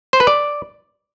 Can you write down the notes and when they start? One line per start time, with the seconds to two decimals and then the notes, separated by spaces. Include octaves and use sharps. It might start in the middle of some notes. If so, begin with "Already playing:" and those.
0.13 C5
0.20 B4
0.27 D5